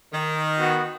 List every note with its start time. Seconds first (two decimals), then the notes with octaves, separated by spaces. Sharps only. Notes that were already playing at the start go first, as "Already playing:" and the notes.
0.12 D#3
0.58 B3 F#4